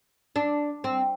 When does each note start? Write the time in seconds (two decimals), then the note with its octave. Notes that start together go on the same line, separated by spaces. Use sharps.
0.36 D4
0.84 C4